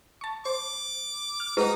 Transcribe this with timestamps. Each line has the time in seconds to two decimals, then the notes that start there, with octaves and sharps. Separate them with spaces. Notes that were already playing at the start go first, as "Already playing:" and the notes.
0.21 A5 C#6
0.45 C5 D6
1.40 F6
1.57 G#3 D#4 F#4 G#4 B4